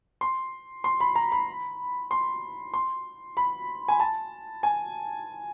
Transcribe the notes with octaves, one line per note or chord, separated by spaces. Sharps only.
C6
C6
B5
A#5
B5
C6
C6
B5
G#5
A5
G#5